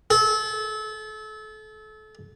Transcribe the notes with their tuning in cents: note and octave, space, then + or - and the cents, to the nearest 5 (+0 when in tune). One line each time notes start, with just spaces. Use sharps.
A4 -30